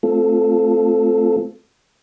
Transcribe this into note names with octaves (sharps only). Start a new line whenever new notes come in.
A3 C4 F4 A4